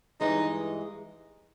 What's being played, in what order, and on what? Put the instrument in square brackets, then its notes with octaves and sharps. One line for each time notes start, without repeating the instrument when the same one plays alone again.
[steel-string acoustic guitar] G2 E3 G#3 [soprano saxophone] D#4